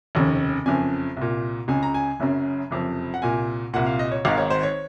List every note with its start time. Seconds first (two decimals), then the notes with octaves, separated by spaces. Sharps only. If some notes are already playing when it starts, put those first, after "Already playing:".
0.15 F1 D#2 C#3
0.66 F#1 F2 C#3 G#5
1.17 C2 A#2
1.68 C#2 C#3 G#5
1.83 A#5
1.94 G#5
2.20 F#1 F#2 C#3
2.71 F#1 F2 C3
3.14 F#5
3.22 C2 A#2 G#5
3.73 C2 A#2 F#5
3.86 F5
3.99 D#5
4.11 C#5
4.25 G#1 G#2 D#3 F5
4.38 C#5
4.50 C5
4.63 C#5